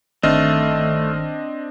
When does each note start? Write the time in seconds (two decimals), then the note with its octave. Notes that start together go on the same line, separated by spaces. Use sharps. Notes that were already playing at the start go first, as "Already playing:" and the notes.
0.23 G1 D#3 A3 C4 D4 D#5 F6